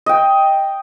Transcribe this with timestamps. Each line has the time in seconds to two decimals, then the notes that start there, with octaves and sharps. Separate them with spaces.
0.06 D#5 G5